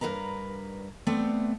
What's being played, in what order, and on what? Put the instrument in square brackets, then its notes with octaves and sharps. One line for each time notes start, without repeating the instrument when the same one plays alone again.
[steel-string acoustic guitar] G2 F3 A#4 B4 A#5
A3 B3 C4 D5